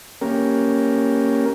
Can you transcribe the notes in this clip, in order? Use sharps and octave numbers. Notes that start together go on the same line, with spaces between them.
A#3 C#4 G4 A#4